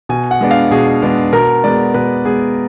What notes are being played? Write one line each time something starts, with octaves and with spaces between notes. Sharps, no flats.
B2 G#5
F#5
G#3 B3 D4
F5
B2 G#4
G#3 B3 D4
B2 A#4
G#3 B3 D5
B2 B4
G#3 B3 G#4